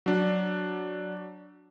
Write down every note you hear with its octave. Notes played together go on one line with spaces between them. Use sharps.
F#3 D4